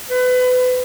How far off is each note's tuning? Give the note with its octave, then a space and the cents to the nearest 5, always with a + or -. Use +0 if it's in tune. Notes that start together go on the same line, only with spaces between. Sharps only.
B4 +30